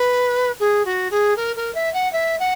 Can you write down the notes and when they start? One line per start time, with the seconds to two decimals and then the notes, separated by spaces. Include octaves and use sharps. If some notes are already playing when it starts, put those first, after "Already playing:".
Already playing: B4
0.60 G#4
0.85 F#4
1.11 G#4
1.36 A#4
1.56 A#4
1.75 E5
1.94 F#5
2.13 E5
2.39 F#5